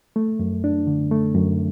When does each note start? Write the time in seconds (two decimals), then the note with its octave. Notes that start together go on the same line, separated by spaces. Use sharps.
0.16 A3
0.39 F#2
0.64 D4
0.87 D3
1.11 A3
1.35 F#2